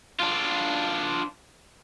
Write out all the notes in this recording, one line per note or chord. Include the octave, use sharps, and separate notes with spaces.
D4 F4